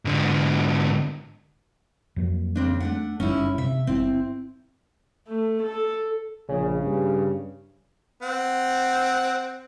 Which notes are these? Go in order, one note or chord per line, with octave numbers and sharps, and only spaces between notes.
G#2 D3
F2 F#3 A#3
C#3 C4 D4
A3 D4 F#5
F#1 G2 C#4 D#4 E4
C3 E5
G1 C4 E4
A3
A4
A#1 C#3
G2
C4 F#5